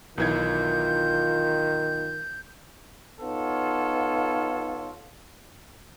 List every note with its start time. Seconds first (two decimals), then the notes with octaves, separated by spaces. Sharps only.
0.18 B1 D#3 E3 F4 G6 G#6
3.21 B3 D#4 F4 A4 C#5